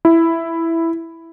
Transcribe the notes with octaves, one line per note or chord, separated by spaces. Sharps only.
E4